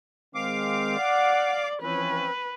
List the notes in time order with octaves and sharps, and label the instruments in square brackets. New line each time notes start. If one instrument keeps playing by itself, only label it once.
[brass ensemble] D#3 G#3 C4 [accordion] F5 D6
[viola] D5 [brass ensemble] F#5
[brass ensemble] E3 F3 C#4 [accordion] C4 [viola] B4